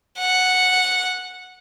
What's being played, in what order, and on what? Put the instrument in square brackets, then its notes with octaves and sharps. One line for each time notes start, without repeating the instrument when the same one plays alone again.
[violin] F#5